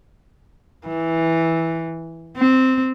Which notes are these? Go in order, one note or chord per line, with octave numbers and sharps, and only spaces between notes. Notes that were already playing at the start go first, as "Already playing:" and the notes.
E3
C4